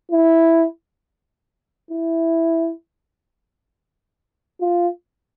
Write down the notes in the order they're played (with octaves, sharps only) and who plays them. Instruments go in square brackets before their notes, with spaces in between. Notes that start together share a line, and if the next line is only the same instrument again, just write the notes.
[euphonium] E4
E4
F4